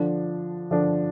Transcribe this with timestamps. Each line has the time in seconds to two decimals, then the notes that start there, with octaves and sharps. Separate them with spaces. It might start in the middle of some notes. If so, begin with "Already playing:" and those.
Already playing: D3 F3 D4
0.71 D3 F3 D4